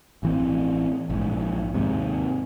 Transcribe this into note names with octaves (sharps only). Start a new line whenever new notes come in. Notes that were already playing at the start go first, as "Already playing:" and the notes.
A1 E3 C4
A#1 G#2
D#2 G#2 C3